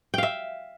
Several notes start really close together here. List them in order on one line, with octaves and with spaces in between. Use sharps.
G5 F5 E5